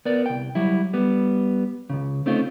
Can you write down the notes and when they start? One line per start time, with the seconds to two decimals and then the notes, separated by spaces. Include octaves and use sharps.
0.05 B3 A#4 D5
0.26 C2 G5
0.55 F#3 G3 E4
0.93 G3 B3
1.90 C#2 F#2 C#3
2.26 A3 C4 C#4 D#4 F4